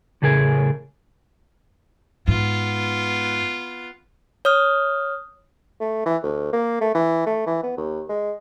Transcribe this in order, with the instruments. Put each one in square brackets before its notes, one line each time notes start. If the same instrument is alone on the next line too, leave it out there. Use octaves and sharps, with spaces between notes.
[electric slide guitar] A2 C#3 A3 G#4 A#4 G#5
[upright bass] G#2 [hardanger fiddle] B3 F4
[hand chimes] C#5 D#6 F6
[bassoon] A3
E3
D2
A#3
A3
E3
A3
E3
B3
D#2
G#3